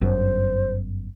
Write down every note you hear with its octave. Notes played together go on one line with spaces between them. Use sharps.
G1 F#2 C5